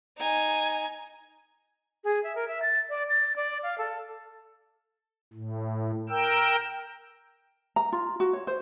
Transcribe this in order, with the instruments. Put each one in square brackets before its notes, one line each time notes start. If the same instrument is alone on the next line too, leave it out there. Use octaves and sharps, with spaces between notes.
[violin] D#4 G#5
[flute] G#4
E5
A#4
E5
A6
D5
A6
D5
F5
A4
[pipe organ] A2
A#4 G5 E6
[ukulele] A#5
F4
F#4
C#5
C5